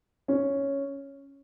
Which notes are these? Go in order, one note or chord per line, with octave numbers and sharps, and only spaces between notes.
C#4